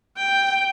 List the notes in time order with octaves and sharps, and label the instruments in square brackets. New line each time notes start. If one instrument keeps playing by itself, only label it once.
[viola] G5